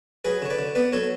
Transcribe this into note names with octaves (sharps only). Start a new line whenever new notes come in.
F#3 G#4 B4
D3 C#5
B4 D5
D3
B3 B4 D5
F#3 A4 C#5